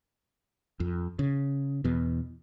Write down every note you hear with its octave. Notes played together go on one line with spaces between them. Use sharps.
F2
C#3
E2 B2